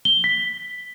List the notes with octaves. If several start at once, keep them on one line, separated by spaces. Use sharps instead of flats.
G7
B6